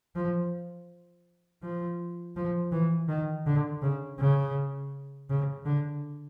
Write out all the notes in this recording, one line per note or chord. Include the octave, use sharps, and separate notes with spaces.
F3
F3
F3
E3
D#3
D3
C#3
C#3
C#3
D3